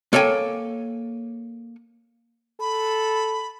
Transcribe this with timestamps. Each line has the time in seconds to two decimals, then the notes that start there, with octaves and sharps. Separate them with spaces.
0.13 A#3 A4 C#5 G5 G#5
2.60 A4 B5